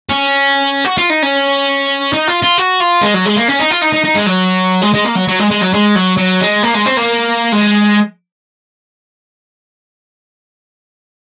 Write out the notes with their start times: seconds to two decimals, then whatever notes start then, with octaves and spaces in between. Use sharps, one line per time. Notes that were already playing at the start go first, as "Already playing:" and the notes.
0.10 C#4
0.85 F#4
0.98 F4
1.10 D#4
1.23 C#4
2.13 D#4
2.28 F4
2.43 F4
2.58 F#4
2.80 F4
3.02 G#3
3.14 F#3
3.25 G#3
3.36 A#3
3.48 C#4
3.59 D#4
3.70 F4
3.81 D#4
3.93 D#4
4.04 D#4
4.15 G#3
4.26 F#3
4.82 G#3
4.94 G#3
5.05 A#3
5.16 F#3
5.28 F#3
5.39 G#3
5.51 G#3
5.61 F#3
5.73 G#3
5.95 F#3
6.17 F#3
6.41 G#3
6.63 A#3
6.74 G#3
6.86 C4
6.97 A#3
7.52 G#3